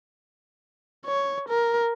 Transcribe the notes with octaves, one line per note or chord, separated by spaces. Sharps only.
C#5
A#4